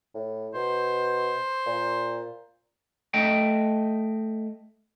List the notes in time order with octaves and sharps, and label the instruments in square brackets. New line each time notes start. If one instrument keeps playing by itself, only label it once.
[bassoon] A2
[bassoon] B2 [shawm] C5
[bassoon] A#2
[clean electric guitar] A3 D#5 G5